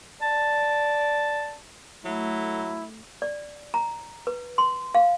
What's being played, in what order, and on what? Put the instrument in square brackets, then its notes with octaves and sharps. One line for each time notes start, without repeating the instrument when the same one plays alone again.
[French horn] D5 [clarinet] A5
[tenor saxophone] F#3 [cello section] A3 [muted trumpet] E4
[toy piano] D5
A#5
B4
C6
F5